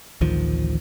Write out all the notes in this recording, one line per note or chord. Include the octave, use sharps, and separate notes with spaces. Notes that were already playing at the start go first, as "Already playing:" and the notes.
A1 D2 D#3 F3